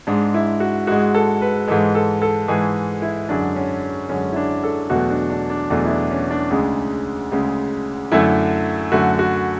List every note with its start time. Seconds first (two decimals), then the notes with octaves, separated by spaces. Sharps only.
0.07 G#2 G#3 D4
0.34 E4
0.60 F#4
0.87 G#2 G#3 F#4
1.15 A4
1.41 B4
1.68 G#2 E3 G#3 A4
1.95 A4
2.22 A4
2.48 G#2 E3 G#3 G#4
3.02 E4
3.29 F#2 D3 G#3 D4
3.56 C#4
4.09 F#2 D3 G#3 C#4
4.32 E4
4.36 D4
4.64 A4
4.90 E2 B2 F#3 A3 F#4
5.10 D4
5.30 D4
5.50 D4
5.70 E2 B2 F#3 A3 D4
5.85 E4
5.90 D4
6.11 C#4
6.31 D4
6.51 D2 C#3 G#3
7.32 D2 C#3 G#3
8.12 F#2 D3 A3 E4
8.92 F#2 D3 A3 F#4
9.19 F#4